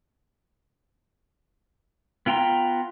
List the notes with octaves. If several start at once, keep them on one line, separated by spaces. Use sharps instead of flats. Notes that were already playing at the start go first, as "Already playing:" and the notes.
B3 F4 G5 A#5 C6